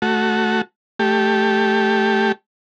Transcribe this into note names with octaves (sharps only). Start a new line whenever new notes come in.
A3 F#4
A3 G4